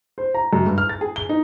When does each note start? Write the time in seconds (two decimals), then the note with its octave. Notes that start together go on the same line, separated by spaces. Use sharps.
0.18 C5
0.34 A#5
0.53 F#2
0.66 G2
0.78 F6
0.89 A6
1.01 G#4
1.16 G7
1.29 D#4